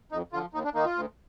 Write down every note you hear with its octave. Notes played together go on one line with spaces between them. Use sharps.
F2 D#4
D3 F3 F4
D#2 D#4
D4
D#3 A#3 D#4
F4
D2